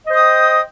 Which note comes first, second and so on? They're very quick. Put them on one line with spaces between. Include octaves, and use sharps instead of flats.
D#5 C5 D#6 G5